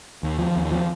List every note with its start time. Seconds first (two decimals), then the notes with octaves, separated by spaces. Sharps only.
0.23 D#2
0.39 F3
0.56 D#2
0.71 F3